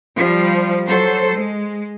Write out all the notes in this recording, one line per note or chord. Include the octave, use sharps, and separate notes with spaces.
F3 G3
F#3 A4 C5
G#3